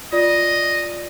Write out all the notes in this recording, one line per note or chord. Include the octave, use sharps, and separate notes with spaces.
F4 D5 D#5